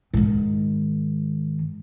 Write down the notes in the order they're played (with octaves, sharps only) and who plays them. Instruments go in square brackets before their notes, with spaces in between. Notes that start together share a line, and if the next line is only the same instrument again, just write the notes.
[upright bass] G#2 D#3